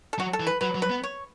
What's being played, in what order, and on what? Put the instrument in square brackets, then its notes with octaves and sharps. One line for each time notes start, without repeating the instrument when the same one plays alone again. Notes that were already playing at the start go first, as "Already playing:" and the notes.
[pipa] A4
[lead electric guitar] F#3 [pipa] F#4
[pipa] A4
[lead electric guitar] E3
[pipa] B4
[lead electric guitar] F#3 [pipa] B4
[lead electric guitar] F#3
[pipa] B4
[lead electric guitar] B3
[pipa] C#5